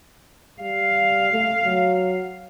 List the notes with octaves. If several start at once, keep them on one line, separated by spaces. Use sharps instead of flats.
G3 F5
A3
F#3